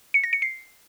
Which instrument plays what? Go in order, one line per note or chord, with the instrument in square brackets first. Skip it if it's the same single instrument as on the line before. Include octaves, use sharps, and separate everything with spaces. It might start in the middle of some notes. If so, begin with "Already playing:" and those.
[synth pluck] C#7
A#6
C#7
C7